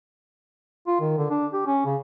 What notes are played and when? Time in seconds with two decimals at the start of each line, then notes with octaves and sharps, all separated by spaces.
0.87 F4
1.00 D#3
1.17 D3
1.30 D4
1.53 G4
1.66 C#4
1.85 C#3